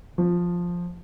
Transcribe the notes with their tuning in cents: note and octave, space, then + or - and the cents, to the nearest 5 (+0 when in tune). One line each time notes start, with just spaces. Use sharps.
F3 +5